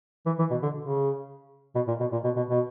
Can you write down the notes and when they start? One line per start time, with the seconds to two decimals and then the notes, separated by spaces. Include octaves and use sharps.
0.26 E3
0.39 E3
0.51 B2
0.63 D3
0.82 C#3
1.75 B2
1.88 A#2
2.00 B2
2.12 A#2
2.24 B2
2.36 B2
2.50 B2